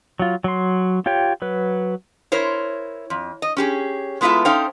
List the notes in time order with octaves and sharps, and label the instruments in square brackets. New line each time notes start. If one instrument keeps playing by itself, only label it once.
[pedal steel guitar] F#3 F4
F#3 C6
F4 G4 C#5 G5
F#3 B4
[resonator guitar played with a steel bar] E4 A#4 C5 C#5
F2
D#5
C#4 G4 G#4
G#3 B3 E4 F4 A4 E5
C#4 D#4 A4 C5 F5 G5